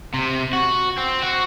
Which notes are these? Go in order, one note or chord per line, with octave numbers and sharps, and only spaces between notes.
C3
F#4
C4
F#4